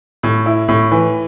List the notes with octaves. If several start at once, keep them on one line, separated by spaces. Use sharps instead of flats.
A2
E4
A2
E3